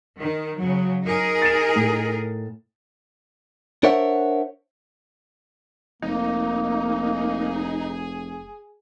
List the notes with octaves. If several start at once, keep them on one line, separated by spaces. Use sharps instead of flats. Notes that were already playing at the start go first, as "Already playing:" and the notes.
D#3
C#3 F#3
D#4 G#4 A#4
A6 E7
A2
D4 A#4 C5 C#5 E5 F#5
F1 A#3 D#4
G#4